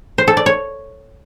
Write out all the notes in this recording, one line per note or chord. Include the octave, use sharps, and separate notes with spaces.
C5
A4
D5
C#5